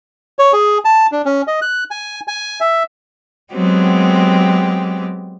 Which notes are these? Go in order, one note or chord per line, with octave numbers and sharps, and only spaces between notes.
C#5
G#4
A5
D4
C#4
D#5
F#6
G#5
G#5
E5
F#3 G#3 B3 C4 G4